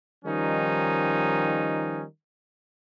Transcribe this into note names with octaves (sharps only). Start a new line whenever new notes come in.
D#3 F3 G3 C#4 D#4